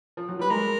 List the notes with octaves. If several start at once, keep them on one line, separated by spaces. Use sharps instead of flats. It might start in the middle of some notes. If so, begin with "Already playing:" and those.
F3
F#3
G3 B4
G#3 A#4